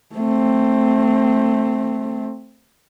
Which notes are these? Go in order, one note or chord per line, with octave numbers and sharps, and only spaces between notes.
A3 C4